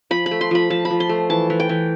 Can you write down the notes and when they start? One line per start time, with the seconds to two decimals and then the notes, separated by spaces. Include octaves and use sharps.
0.11 F3 B5
0.26 B5
0.31 A3
0.41 C6
0.51 F3 B5
0.70 F3 A5
0.85 B5
0.90 F3
1.00 C6
1.09 A3
1.30 E3 A5
1.50 E3
1.60 G5
1.69 E3